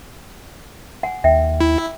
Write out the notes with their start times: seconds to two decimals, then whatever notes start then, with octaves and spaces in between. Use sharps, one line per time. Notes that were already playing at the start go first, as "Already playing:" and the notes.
1.03 F#5 G#5
1.24 D#2 E5 G5
1.61 E4